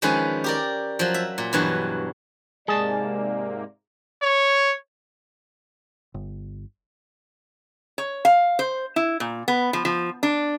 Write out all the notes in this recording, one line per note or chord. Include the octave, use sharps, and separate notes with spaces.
D#3 F3 G#3 C#4 B4
G4 A#4 D5
F3 F#3
E5
A#2
G2 B2 E3 F#3
G#2 C3 G#3 A#3 G#4 D5 A5
C#5
G1
C#5
F5
C5
E4
A#2
B3
F3
F3
D4